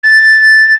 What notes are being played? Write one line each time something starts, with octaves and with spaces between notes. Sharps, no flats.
A6